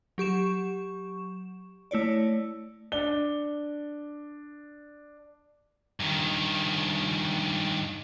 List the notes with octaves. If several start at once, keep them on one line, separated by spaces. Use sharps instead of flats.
F#3 G4 C#6 E7
A3 E4 C#5 D5
D4 G7
G2 D#3